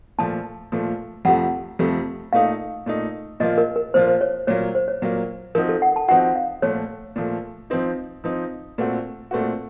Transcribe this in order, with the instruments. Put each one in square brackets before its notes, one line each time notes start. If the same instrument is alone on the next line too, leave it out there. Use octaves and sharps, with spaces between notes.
[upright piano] A#2 F3 A3 [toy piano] A5
[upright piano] A#2 F3 A3
[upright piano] F2 C3 F3 A3 [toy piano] F#5
[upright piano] F2 C3 F3 A3
[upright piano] A#2 A3 D#4 [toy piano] F5
[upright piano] A#2 A3 D#4
[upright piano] A#2 F3 A#3 F4 [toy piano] D#5
[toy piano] A#4
A#4
[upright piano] A#2 F3 A#3 F4 [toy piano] C5
[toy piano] C5
C#5
[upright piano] A#2 F#3 A#3 [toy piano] C#5
[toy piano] C5
C#5
[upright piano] A#2 F#3 A#3
[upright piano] F3 C4 D#4 F#4 [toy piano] A#4
[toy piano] A4
F#5
A5
[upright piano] F3 C4 D#4 F#4 [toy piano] F#5
[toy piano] F5
[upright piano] A#2 F3 A3 [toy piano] C#5
[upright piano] A#2 F3 A3
F3 C4 D#4
F3 C4 D#4
A#2 A3 C4 F#4
A#2 A3 C4 F#4